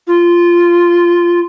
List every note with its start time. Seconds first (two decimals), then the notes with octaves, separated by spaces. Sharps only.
0.07 F4